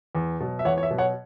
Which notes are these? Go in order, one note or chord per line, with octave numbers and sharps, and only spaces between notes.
E2
B2 F#3
E5
E2 C#5 F#5
C#5
E5
B2 F#3
C#5 F#5